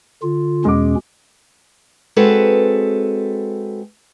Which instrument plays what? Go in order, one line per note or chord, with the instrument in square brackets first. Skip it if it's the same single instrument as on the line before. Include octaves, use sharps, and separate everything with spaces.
[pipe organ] D3 F4
[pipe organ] E2 B2 C#4 [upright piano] G#3 D6
[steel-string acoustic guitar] G#3 C4 F#4 A4 B4